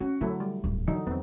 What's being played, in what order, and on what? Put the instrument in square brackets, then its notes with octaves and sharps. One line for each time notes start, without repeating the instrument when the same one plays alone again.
[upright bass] C#4 [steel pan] F#4
[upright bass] D3 [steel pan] F#3 A3 E4
[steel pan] G3
[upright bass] D1 G2
[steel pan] D3 F#3 D#4 [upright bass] E3
[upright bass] E2 [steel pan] B3 C4